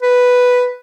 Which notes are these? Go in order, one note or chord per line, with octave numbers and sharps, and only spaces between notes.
B4